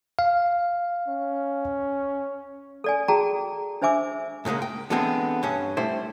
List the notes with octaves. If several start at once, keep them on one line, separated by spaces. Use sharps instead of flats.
F5
C#4
A4 D5 G#5
F#4 G#4 G5 A5 A#5
D4 C5 E5 G#5 D6 E6
G#2 C#3 G3 G#3 A#3
G5
D3 E3 G#3 B3 C4
G2 C#4
G3 A3 E4 C5 G5